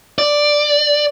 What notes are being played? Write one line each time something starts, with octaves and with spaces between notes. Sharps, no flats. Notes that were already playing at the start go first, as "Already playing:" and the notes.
D5